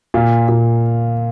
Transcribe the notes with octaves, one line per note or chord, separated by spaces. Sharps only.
A#2 F5
A#2